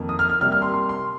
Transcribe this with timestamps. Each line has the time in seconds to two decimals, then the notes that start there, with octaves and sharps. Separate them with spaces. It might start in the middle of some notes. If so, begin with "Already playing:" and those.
Already playing: F2 D#3 A#3
0.09 D#6
0.19 F6
0.30 F6
0.41 C3 G3 A#3 F6
0.52 F6
0.62 C6
0.74 C6
0.89 C6